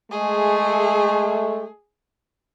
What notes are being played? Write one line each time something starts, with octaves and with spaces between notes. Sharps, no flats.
G#3 A3 G#4